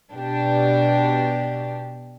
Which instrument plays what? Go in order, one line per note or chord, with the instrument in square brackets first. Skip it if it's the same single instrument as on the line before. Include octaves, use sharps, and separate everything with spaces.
[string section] B2 D4 G4